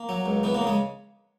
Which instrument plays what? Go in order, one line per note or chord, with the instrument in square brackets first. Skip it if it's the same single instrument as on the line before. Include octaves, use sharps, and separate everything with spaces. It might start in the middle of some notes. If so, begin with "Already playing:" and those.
Already playing: [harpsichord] A#3
F#3
C#2
E3 B3
A#3
C#3
G#3